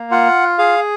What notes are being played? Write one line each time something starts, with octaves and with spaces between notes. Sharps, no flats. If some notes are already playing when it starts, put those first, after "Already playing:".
Already playing: A#3
F4 F#5
G#4 F5